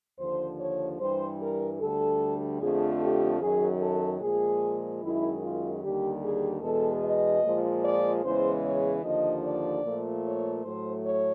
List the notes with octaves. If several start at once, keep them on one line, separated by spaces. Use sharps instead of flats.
D#2 D3 F3 C5
C#5
G2 E3 G3 C5
A#4
D2 D3 G3 A4
F2 D3 F3 A3 G#4
G4
F#2 D#3 F#3 G#4
A4
A#2 F3 G#3 G#4
F#2 D#3 G#3 E4
F4
D#2 D3 G3 G4
G#4
E2 B2 G#3 A4
D#5
A#2 F3 G#3
D5
E2 C#3 E3 G#3 C5
C#5
D#2 D3 F3 D#5
D5
A#2 F3 A3
C#5
A2 F#3 A3 C5
C#5